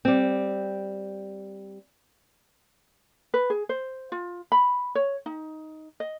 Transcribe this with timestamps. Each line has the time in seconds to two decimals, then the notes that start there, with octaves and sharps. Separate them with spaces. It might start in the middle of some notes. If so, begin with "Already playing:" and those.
0.05 G3 C4
3.34 B4
3.50 G#4
3.69 C5
4.12 F4
4.52 B5
4.95 C#5
5.26 D#4
6.00 D#5